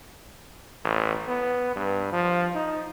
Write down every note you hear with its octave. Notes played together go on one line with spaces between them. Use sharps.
A1
B3
G2
F3
D#4